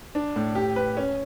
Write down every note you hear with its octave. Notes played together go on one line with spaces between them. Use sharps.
D4
A2
G4
B4
C#4